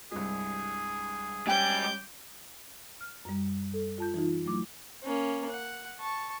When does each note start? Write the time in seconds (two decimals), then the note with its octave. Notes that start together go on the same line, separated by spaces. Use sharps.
0.12 C2 G2 G#3 G#4
1.47 G3 G#3 C#4 G5 G#5 D6 G6
3.01 F6
3.25 F#2 G3
3.74 A4
3.98 F4 A5 G6
4.14 E3 D#4 F4
4.46 F#3 A3 E4 D6
5.03 A#3 C#4
5.50 F#5
6.00 A5 C#6